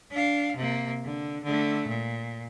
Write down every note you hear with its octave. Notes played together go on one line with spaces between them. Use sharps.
D4 F5
C3 A#3
D3
D3 A3
A#2